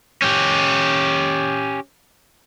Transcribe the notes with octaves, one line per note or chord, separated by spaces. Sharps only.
C#4 G4